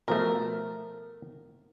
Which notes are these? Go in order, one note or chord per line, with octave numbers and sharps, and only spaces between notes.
B2 F3 A3 A#4